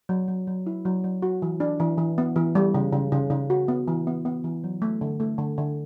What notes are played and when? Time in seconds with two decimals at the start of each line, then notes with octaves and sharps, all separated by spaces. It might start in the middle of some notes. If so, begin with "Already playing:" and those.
0.09 F#3
0.28 F#3
0.47 F#3
0.67 E4
0.85 F#3
1.04 F#3
1.22 F#4
1.42 E3
1.60 D4
1.80 E3
1.98 E3
2.18 B3
2.36 E3
2.55 G3
2.74 C#3
2.92 C#3
3.12 C#3
3.30 C#3
3.50 F#4
3.68 B3
3.88 E3
4.07 B3
4.25 B3
4.44 E3
4.64 F#3
4.82 A3
5.01 D3
5.20 A3
5.38 D3
5.58 D3